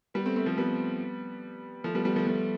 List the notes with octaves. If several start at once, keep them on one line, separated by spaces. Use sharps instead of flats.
G3 B3
A3 C4
A3 C4
F3 A3
G3 B3
F3 A3
G3 B3
G3 B3
F3 A3
F3 A3